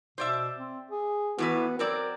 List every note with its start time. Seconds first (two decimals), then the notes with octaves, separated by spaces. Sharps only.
0.18 B2 C5 D5 E5
0.57 C4
0.91 G#4
1.38 A2 E3 B3 F#4 B4
1.79 F#3 C4 A#4 D5